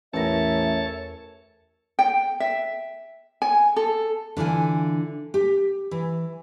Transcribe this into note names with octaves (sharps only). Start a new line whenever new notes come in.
A1 E2 A4 A#4 C#5 E5 A5 A#6
G5
E5
G#5
A4
D3 E3 F4 G#5
G4
E3